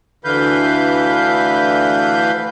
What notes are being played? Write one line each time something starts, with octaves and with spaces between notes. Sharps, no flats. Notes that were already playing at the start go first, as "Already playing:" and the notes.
D2 D3 E3 B4 F5 G6